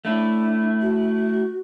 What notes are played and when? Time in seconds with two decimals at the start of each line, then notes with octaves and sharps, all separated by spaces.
0.05 A3 D4 E4
0.81 F#4